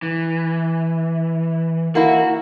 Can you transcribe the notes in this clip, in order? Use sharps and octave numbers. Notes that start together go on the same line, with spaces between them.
E3
A#3 E4 F#4